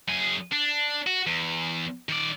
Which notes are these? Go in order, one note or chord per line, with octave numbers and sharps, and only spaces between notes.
F#2 G#4
D4
F#4
E2
D#3 D5